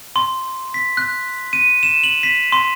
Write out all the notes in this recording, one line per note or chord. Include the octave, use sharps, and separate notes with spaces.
C6
B6
F#6
D#7
E7
F#7
B6
C6